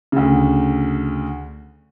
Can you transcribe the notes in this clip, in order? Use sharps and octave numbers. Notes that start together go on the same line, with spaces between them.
D2 C#3